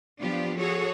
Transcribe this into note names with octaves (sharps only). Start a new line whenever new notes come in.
F3 B3 D4 F4 G4
F#4 G#4 A4 C#5